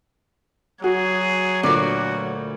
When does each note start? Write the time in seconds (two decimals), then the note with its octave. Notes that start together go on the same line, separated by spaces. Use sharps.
0.84 F#3 F#4 G#4
1.63 D2 A#2 F#4 B4 D5